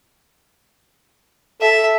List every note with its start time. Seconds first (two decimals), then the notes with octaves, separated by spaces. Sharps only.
1.62 A4 E5